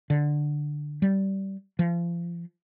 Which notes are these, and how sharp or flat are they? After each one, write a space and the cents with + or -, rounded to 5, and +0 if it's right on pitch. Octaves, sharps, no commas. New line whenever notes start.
D3 +10
G3 -15
F3 -30